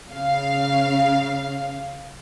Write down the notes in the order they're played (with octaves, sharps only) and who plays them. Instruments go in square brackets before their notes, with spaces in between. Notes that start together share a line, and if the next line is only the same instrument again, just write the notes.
[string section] C#3 F5